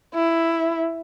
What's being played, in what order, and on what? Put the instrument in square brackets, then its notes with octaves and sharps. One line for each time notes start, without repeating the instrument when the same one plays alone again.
[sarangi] E4